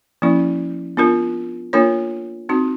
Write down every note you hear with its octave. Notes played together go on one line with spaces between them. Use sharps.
F3 A#3 C#4 E4
B3 D4 F4 A#4
A#3 D4 F4 A#4 C#5
C4 D#4 F#4